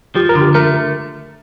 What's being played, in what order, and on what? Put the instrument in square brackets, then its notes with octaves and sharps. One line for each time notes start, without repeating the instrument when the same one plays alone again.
[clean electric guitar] F3 [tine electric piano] G4
[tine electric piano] A#4
[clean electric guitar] D3
[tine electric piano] G4
[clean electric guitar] A3 [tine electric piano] A#4